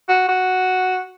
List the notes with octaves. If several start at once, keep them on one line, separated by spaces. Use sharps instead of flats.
F#4
F#4